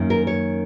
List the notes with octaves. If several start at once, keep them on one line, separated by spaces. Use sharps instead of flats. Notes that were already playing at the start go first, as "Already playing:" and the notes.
Already playing: F#2 D#3 A#3 C#4
A#4
C#5